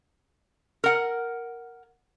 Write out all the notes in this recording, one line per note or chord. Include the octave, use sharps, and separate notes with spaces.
A#4 F#5